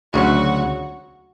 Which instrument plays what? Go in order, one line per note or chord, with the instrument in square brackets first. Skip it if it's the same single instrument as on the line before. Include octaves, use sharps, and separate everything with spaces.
[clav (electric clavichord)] D2 C#3 F#3 [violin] F#4